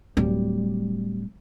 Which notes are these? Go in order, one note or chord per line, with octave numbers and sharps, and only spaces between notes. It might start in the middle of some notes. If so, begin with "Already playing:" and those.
D1 G3